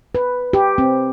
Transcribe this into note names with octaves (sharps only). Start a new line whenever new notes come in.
B4
G4
C4